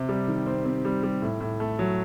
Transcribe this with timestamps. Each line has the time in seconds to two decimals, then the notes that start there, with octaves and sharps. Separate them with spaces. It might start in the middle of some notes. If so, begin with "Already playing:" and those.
Already playing: C3
0.09 G3
0.28 D#3
0.46 C4
0.65 C4
0.85 G3
1.03 G3
1.22 A2
1.40 A2
1.60 A3
1.79 F#3